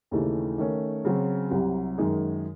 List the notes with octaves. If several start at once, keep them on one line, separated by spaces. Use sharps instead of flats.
D#2 C#3 E3 A3 D#4
D#3 A3 C#4
C#3 F#3 C4
C2 C3 F#3
F#2 D#3 G#3 D#4 G#4